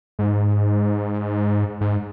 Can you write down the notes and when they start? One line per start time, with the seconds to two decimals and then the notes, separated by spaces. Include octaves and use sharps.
0.19 G#2
1.81 G#2